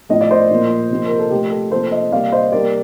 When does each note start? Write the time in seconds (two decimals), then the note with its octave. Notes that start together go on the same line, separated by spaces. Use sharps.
0.09 A2 F3 A3 D#5
0.21 D5
0.31 C5 D#5
0.51 A#2 F3 A#3
0.90 C3 F3 A#3
1.06 A#4
1.19 A4
1.30 C3 F3 A3 G4
1.51 A4
1.71 C3 F3 A#3 A4 C5
1.91 C5 D#5
2.12 C3 G3 A#3 D5 F5
2.32 C5 D#5
2.52 C3 G3 A#3 A#4 D5